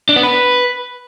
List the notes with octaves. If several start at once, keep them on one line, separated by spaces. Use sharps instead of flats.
D4
B3
B4